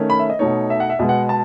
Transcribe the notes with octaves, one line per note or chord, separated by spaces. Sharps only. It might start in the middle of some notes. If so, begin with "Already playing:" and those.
Already playing: D#3 A3 C#4
B5
E5
D#5
B2 A3 D#4 C#5
E5
F#5
E5
B2 G#3 B3 D#5
F#5
A5